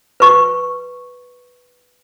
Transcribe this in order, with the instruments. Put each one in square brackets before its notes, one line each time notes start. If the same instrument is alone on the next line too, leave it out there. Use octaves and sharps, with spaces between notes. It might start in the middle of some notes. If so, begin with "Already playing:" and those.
[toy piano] B4 C#6